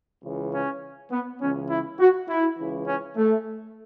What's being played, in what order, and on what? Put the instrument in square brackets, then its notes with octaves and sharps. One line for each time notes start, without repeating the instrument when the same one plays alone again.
[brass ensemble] C#2 C#3 E3
C#4
B3
C#2 C#3 E3 C#4
E4
F#4
E4
C#2 C#3 E3
C#4
A3